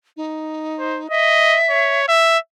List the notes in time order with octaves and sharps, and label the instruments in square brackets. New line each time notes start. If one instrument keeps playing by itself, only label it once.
[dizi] D#4
[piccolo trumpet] C5
[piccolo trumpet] D#5 [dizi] E5
[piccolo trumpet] C#5
E5